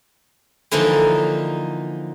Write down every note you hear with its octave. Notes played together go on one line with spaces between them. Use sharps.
D3 E3 F3 A#3 D#4